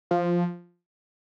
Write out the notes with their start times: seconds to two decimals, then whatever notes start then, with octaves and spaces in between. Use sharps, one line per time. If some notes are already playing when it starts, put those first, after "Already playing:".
0.11 F3